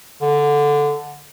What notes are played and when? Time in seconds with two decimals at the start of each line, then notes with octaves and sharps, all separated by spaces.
0.21 D3